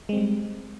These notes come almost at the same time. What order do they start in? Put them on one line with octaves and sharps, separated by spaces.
G#3 C4 G3